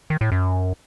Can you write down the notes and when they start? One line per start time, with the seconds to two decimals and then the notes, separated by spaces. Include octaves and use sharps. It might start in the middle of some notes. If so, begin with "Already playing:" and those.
0.10 D#3
0.21 A2
0.32 F#2